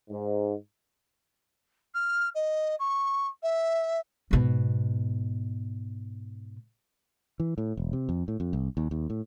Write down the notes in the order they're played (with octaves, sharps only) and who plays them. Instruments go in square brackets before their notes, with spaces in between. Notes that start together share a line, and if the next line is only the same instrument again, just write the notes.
[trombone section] G#2
[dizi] F6
D#5
C#6
E5
[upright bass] G#2 B2
[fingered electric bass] E3
A2
E1
C3
F2
A2
F2
C2
D#2
D#2
A2